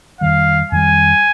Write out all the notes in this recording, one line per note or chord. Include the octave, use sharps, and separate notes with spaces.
F2 D#3 G3 F5
F2 D#3 G3 G#5